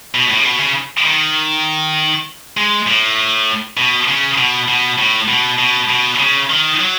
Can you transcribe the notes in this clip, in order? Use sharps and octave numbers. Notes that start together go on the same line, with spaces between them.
B2
A2
C#3
B2
C#3
D#3
G#3
A2
B2
C#3
B2
B2
A2
B2
B2
B2
C#3
D#3
F#3